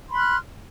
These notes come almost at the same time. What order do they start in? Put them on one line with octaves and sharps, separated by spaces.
C6 B5 F#6 F6